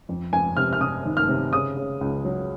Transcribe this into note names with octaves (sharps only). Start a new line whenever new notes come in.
F2
F2 G#5
C3 F6
F6
C3 D#6
D#3
F6
C3
C#3 D#6
C#3
C#2
F#3